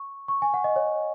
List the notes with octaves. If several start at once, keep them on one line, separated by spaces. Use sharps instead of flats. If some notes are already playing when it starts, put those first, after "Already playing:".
Already playing: C#6
C#6
G#5
F#5
D#5
C#5